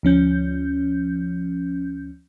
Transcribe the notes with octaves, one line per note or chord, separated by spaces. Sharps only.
D2 F3 C#4 G6